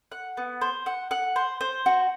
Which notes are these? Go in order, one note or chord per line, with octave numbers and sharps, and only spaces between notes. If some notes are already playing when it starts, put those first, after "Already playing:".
F#5
B3
C5
F#5
F#5
C5
C5
F#4